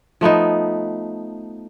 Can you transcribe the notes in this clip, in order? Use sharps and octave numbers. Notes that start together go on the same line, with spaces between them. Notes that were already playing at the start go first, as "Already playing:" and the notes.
F3 A3 B3 D#4